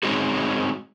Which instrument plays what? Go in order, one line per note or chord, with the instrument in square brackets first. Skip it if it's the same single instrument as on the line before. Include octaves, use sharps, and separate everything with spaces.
[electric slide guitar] G#3 C4 C#4 D#4 F#4 G#4